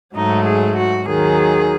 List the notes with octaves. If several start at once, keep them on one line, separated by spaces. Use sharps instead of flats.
G#2 F#3 A3 D#4
G#4
F#4
D#2 D#3 F#3 G#4